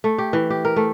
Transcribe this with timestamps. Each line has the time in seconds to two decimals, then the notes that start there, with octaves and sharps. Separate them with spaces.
0.04 A3
0.18 G4
0.33 E3
0.50 G4
0.65 A#4
0.76 A3